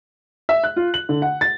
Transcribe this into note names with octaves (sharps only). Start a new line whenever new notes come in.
E5
F#6
F4
F#7
D3
F#5
A6